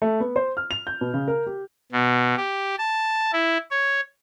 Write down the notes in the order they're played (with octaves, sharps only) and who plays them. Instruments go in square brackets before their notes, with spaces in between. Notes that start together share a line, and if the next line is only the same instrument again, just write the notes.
[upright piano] A3
B3
C5
F6
F7
G6
B2
C#3
A#4
G4
[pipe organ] B2
G4
A5
E4
C#5